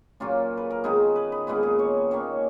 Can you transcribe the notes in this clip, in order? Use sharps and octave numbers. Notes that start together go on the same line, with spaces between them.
A#2 F#3 A#3 C#4 F4
B4
A#4
D#3 G#3 B3 D#4 G#4
B4
B4
A#2 G#3 B3 D#4 B4
G#4
C#5
D#3 A#3 C#4 C#5